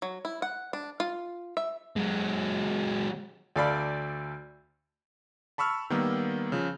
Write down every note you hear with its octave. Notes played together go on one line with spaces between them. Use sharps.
F#3
E4
F#5
D4
F4
E5
F#3 G#3
D2 A4 D5 F5 B5
A5 B5 C#6 E6 F6
D#3 G3 A#3 B3
C#3 F3